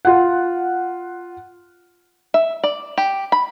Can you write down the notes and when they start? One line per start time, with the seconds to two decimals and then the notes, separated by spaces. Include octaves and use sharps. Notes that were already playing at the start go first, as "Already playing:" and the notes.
0.05 F4 F#5
2.34 E5
2.64 D5
2.98 G4
3.32 B5